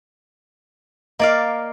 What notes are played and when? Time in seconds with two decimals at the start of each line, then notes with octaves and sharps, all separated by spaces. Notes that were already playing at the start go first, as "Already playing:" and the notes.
1.20 A#3 D5 D#5 F5